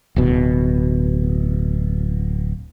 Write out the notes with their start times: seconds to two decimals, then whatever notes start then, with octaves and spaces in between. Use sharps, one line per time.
0.16 D1 B2